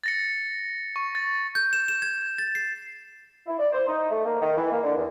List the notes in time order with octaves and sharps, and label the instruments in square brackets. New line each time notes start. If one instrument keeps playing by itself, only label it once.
[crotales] A6 A#6 C#7
C#6
A6
[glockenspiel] G6
E7
E7
G#6
A6
C7
[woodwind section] E4
D5
C5
D#4
A3
A#3
D#3
E3
A#3
D3
E2